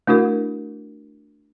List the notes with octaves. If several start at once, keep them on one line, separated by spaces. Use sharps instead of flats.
A3 D4 E4 F#4 A#4